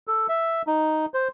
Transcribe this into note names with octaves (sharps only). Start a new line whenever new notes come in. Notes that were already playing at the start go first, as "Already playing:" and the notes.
A4
E5
D#4
C5